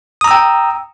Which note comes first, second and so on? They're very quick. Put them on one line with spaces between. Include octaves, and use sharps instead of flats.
D#6 A#5 E6 G5